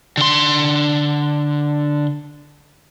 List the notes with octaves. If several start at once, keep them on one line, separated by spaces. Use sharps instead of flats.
D3 C6